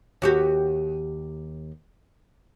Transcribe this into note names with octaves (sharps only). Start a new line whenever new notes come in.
D#2 F#4 G4